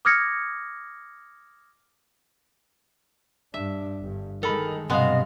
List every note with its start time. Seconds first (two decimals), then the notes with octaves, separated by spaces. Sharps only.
0.05 D6 D#6 F6 G#6 A#6 C#7
3.54 G2 D4 E5
4.00 G1 G2
4.43 D#3 G#3 A4 A#4 B5
4.90 B1 G2 C3 G#3 B3 D#5 F5